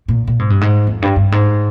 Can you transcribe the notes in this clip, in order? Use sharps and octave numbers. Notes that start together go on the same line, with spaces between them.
A#2
A#2
G#2
G2
G#2
F2
G2
G2
G#2